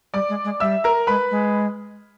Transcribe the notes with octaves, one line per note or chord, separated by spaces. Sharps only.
G3 D5 D6
G#3
G#3
G3 E5 E6
A#4 A#5
G#3 B4 B5
G#3